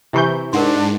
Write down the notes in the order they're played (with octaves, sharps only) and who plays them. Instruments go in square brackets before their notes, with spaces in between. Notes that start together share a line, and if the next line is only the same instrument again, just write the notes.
[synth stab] C3 E3 G6 [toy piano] E4 G4 C#6
[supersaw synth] G#2 [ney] D4 [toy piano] A#4 F#5 C6